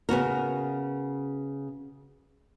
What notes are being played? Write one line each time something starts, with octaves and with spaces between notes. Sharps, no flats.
C#3 B3 F#4 A#4